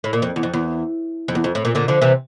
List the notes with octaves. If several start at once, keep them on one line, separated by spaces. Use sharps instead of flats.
A2
A#2
F2
E2
F2
E2
F2
E2
F2
A2
A#2
A#2 D3
D3 F3
C3 E3